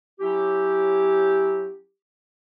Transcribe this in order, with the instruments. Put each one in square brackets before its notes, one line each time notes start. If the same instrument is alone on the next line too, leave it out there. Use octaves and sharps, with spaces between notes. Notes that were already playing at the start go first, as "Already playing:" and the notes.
[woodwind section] F#3 C#4 E4 G4